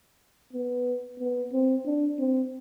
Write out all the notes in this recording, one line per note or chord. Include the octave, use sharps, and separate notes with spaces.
B3
B3
C4
D4
C4